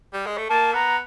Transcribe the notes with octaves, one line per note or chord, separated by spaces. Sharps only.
G3
G#3
A3
A#3 A5
B3 A#5